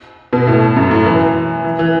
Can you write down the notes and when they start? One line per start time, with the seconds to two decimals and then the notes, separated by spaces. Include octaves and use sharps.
0.33 B2
0.47 A2
0.76 F#2
0.91 A2
1.06 E3
1.64 E3
1.79 E3